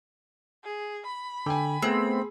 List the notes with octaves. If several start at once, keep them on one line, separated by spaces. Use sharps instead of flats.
G#4
B5
D3 G5 G#5
A3 B3 C4 G#4